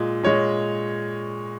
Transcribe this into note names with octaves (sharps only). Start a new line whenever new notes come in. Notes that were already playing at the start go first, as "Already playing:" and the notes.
Already playing: A#2 G#3
A#2 G#3 C#5